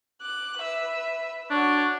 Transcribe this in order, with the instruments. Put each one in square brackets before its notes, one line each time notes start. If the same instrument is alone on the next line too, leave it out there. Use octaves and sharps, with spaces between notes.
[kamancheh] D6 F#6
B4 E5
[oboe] D4 [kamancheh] F#4 C#5